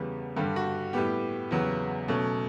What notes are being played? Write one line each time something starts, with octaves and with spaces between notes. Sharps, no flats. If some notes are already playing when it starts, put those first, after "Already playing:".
Already playing: E2 C#3 G3 B3
G2 D3 G3 G4
F#4
A2 G3 B3 G4
E2 C#3 F#3 B3
B2 F#3 A3 C#4